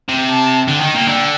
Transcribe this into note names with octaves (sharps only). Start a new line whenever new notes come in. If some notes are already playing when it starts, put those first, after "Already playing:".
C3
A5
D3 G5
D#3
A#2
D3